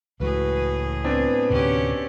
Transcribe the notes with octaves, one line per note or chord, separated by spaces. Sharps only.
C#2 A2 E3 G#3 F#4 G#4 B4
B3 C4 D4 B4
D2 A2 C3 C#4 F#4 G4